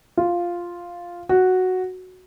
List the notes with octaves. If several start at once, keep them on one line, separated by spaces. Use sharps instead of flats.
F4
F#4